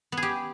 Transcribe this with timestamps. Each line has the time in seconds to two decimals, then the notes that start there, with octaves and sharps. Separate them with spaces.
0.12 B3
0.17 G#4
0.22 G4